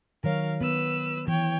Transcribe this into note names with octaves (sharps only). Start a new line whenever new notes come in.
D#3 F#3 A#4 C#5 F5
B3 B4 E6
E3 C#5 G5